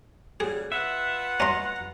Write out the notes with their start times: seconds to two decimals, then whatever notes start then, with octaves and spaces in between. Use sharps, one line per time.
0.40 C#3 F#3 G3 G#4
0.72 F4 B4 E5 F#5
1.40 C#4 D#5 A#5 C6